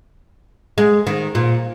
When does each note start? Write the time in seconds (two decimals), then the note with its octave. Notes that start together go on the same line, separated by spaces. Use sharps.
0.78 G#3
1.07 D#3
1.35 A#2